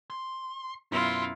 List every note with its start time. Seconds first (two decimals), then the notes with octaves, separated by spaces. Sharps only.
0.10 C6
0.92 F#2 B2 C#4 E4 F4 C6